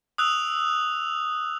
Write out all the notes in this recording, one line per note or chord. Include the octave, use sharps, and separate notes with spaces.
D#6 E6 F#6 F7